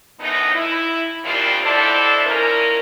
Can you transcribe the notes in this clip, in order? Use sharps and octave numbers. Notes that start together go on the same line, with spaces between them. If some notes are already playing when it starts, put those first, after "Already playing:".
F#2 A2 E3 B3 D#4
E4
A#2 D#3 G3 C4 D4 F4
B2 D4 E4 A4 C5 D5
A#2 C#4 E4 A#4